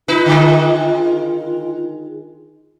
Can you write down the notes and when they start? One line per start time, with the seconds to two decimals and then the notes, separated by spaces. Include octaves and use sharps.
0.08 D#4 F4 B4
0.26 D3 D#3 G#3